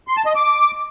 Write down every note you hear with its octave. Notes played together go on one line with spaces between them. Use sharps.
C6
A5
D#5
D6